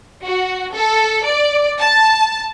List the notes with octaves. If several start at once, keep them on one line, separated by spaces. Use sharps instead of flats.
F#4
A4
D5
A5